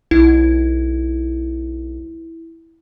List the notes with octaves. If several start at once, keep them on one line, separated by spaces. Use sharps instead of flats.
B1 E4